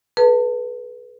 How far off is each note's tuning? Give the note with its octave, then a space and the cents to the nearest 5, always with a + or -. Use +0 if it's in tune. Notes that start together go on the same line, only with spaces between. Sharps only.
G#4 +45 B4 -15 A5 +30